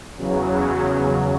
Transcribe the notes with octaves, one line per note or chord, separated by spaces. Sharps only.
E2 C#3 F#3